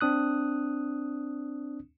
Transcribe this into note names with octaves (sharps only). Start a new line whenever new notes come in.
C4 D4 D#6 F#6